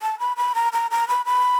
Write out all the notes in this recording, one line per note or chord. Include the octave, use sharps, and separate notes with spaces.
A5
B5
B5
A#5
A#5
A#5
B5
B5